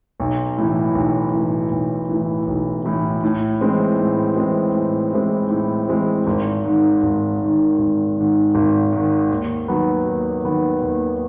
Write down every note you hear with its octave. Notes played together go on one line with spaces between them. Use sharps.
B1
A2 E3
B1
A2 E3
B1
A2 E3
B1
A2 E3
A2
E3 G#3 C4
A2
E3 G#3 C4
A2
E3 G#3 C4
A2
E3 G#3 C4
G#1
G#2 D#3
G#1
G#2 D#3
G#1
G#2 D#3
G#1
G#2 D#3
D#2
D#3 F#3 B3
D#2
D#3 F#3 B3
D#2